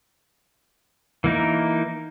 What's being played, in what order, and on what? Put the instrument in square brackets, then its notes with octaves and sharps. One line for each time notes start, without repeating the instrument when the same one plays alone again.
[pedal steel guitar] E3 A#3 D#4 A#4